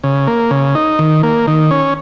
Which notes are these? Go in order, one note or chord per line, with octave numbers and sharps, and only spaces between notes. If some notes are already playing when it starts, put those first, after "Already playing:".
C#3
A#3
C#3
D#4
D#3
A#3
D#3
C#4